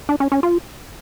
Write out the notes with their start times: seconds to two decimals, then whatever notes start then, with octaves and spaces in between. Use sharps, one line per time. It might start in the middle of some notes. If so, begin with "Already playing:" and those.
0.09 D4
0.20 C#4
0.32 C#4
0.43 F4